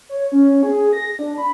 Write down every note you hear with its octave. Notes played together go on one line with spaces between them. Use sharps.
C#5
C#4
G#4
A#6
D4
B5